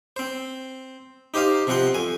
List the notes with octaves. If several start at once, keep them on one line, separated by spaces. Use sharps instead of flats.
C4 C5
D#4 G4 C5 D#5 F5
C3 F3 C4 F#5 C6
F2 G#5